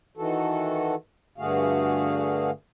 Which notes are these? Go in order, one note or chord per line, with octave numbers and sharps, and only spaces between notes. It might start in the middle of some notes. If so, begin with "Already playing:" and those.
D#3 E3 F#4 A4
G2 D3 A3 F#4 G#4 F5